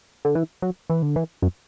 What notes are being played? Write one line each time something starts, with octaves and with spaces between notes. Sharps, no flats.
D3
E3
F#3
E3
D3
E3
F#2